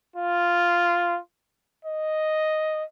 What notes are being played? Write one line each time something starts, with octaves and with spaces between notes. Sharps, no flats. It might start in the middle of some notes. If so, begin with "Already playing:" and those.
F4
D#5